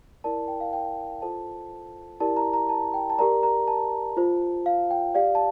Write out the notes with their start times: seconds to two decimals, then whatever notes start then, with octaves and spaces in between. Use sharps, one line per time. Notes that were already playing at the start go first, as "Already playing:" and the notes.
0.24 E4 A#4 D5 A5
0.48 G5
0.60 F5
0.73 G5
1.22 F4 A4 C5 A5
2.20 E4 G4 A#4 D5 A5
2.37 A#5
2.53 A#5
2.69 A5
2.94 G5
3.10 A5
3.19 G4 A#4 D5 A#5
3.43 A#5
3.68 A5
4.17 F4 C5
4.66 F5
4.91 G5
5.15 G4 D5 F5
5.35 A5